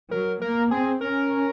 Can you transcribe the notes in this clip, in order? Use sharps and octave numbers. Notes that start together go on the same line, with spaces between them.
F#3 A#4
A#3 A#4
C4 G#4
C#4 A#4